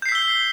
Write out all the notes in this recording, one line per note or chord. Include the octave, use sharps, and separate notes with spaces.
E6 G6 B6 C7 G7